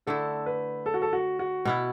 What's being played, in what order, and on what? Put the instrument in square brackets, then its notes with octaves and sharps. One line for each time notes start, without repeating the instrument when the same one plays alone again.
[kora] D3 A3 E4 [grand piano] A4
[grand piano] B4
A4
F#4
A4
F#4
F#4
[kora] B2 B3 E4